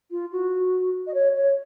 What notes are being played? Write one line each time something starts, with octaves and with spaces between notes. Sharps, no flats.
F4
F#4
D#5
C#5
C#5